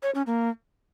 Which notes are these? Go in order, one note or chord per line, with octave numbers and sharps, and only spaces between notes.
C#5
C#4
A#3